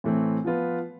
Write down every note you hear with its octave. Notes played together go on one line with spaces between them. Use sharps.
A2 E3 A3 C4
F3 B3 F4 B4